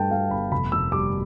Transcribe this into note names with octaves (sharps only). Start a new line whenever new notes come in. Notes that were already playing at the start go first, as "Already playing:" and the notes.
Already playing: G2 A3 G5 A5
A3 F5
G1 B5
F1 B5
F1 E6
G3 D6